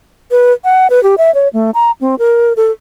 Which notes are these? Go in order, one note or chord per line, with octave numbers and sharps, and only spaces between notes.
B4
F#5
B4
G4
E5
C#5
A3
A#5
C4
A#4
A4